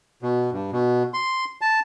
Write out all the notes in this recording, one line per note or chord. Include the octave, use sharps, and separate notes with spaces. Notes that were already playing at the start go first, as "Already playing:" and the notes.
B2
G2
B2
C6
A5